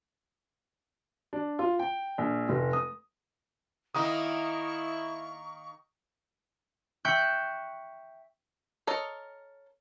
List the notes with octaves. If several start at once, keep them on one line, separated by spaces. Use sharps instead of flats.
D4
F4
G5
A#1
F1
D#6
D#3 A#3 E4 D#5 C#6 D#6
E5 G5 C#6 F#6 G6
A4 A#4 C#5 D#5